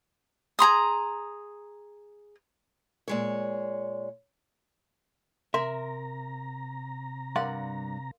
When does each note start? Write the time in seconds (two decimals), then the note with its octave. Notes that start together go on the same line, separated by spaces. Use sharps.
0.59 G#4 A#5 C6 D#6
3.08 A#2 G#3 C#5
5.54 C3 A#4 E5 A#5 C6
7.36 G2 A#4 D5 F5 F#5 C6